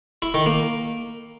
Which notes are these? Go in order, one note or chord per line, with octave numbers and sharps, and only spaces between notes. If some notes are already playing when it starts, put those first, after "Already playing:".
E4
D#3
A#3